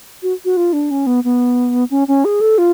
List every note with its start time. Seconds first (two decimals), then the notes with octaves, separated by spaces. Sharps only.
0.23 F#4
0.45 F#4
0.57 F4
0.73 D4
0.91 C#4
1.07 B3
1.24 B3
1.90 C#4
2.08 C#4
2.25 G#4
2.41 A4
2.58 F4